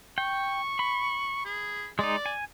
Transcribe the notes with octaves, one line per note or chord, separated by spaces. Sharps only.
G5 C#6
B5
G#4
G#3 D#4 D5
G#5